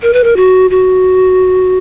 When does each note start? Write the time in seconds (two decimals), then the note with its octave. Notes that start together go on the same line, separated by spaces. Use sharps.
0.02 A#4
0.13 B4
0.24 A#4
0.36 F#4
0.70 F#4